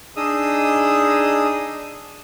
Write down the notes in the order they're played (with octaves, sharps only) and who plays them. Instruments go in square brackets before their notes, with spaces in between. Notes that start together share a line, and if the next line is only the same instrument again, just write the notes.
[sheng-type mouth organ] D4 D#4 G#4 D#5 D#6 E6